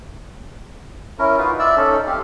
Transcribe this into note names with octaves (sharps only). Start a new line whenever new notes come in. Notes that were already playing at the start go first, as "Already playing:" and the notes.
C#4 E4 A#4
D#4 F4 F#4 B4
D5 E5 E6
C#4 D#4 A4
C4 G4 F5